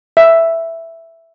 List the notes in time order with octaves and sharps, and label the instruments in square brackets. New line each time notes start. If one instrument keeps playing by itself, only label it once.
[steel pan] E5